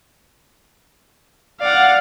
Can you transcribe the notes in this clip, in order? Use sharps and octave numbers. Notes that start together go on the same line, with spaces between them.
D5 F5 F#5